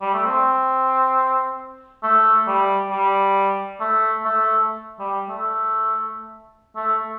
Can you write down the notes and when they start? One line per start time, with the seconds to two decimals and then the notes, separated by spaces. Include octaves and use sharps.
0.02 G3
0.14 A3
0.25 C4
2.03 A3
2.47 G3
2.91 G3
3.80 A3
4.25 A3
4.99 G3
5.29 A3
6.76 A3